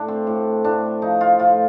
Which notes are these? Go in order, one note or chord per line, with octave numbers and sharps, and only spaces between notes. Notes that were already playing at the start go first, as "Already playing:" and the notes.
Already playing: A2 D4
C4
A2
A2 D4
F3 D#4
F4
A2 F4